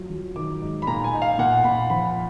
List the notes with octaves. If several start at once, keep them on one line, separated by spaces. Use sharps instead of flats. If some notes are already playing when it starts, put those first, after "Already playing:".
Already playing: F#3 F4
F#3
D#3 D6
G#2
B5
A#2 A#5
G#5
D#4
F5
A#2 F#5
A#2 B5
F3 B5